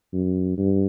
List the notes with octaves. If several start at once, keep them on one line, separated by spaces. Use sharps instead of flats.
F#2
G2